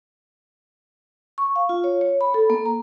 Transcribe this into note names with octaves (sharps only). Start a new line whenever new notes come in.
C#6
F5
F4
C#5
C#5
B5
A4
A#3
A#5